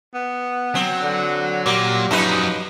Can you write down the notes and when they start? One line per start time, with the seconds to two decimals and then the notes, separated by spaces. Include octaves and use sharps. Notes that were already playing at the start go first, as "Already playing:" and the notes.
0.14 B3
0.75 F#3 C4
1.02 D3
1.66 A#2 G3 A#3
2.11 F#2 F3 F#3 D#4 B4